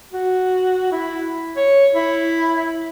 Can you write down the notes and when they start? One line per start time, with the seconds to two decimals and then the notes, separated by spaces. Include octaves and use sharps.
0.13 F#4
0.92 E4
1.57 C#5
1.95 E4